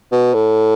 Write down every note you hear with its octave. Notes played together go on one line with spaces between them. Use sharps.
B2
A2